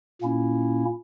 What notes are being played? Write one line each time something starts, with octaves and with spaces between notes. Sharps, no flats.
A#2 A#3 C#4 E4